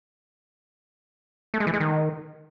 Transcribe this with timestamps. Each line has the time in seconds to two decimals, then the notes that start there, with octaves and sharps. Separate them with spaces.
1.54 A3
1.60 G#3
1.67 E3
1.74 G#3
1.80 D#3